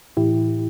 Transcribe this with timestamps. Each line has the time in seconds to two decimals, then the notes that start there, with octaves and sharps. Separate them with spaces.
0.17 A2 E3 E4 G4